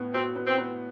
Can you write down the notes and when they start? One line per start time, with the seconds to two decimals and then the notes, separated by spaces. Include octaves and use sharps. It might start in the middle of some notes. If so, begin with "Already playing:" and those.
Already playing: A2 B3
0.13 C4 F#4
0.36 B3
0.47 C4
0.58 B3